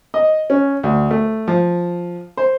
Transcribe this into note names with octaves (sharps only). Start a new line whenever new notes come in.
D#5
C#4
D2
A3
F3
C5